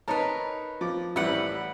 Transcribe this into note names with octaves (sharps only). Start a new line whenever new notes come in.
D#4 A#4 B4 C#5 A5
F3 D6
A1 G3 E4 B4 F#5